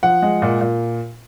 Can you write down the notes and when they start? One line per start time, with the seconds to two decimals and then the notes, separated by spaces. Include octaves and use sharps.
0.03 F3 F#5
0.23 G#3
0.42 A#2
0.61 A#2